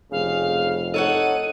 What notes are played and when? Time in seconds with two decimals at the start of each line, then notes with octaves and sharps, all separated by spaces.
0.11 F1 C#3 F5
0.94 D#4 A4 C#5 F#5 D#7